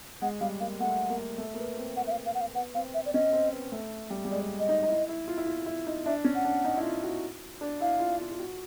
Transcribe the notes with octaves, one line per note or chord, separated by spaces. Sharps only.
G#3 F#5
G3 F5
A#3 F5
A3 F#5
A#3
A3
A#3
B3
C4
F#5
E5
F5
F5
F#5
F5
B3 F#5
C4 F5
E5
D5
C#4 D#5
C4
B3
A3
G3
G3
G#3 D5
D#5
D#4
D#4
E4
E4
F4
E4
F4
E4
D#4
D4 E5
C#4
F#5
D4
D#4
E4
F4
F#4
D4
E4 F5
F4
F4
F4
F#4